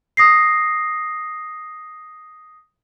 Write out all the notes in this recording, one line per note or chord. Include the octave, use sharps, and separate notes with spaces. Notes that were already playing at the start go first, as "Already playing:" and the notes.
D#6 A#6 C7